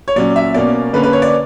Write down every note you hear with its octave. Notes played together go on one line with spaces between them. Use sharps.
C#5
A#2 F#3 C#4 D5
E5
B2 A#3 C#4 D5
D3 A#3 C#4 B4
B4
C#5
D5